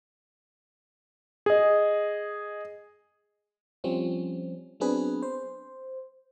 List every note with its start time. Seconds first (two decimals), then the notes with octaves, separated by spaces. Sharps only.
1.46 G#4 D#5
3.84 F3 G3 C4 C#4
4.80 F#3 B3 C4 D4 G#4 B4
5.23 C5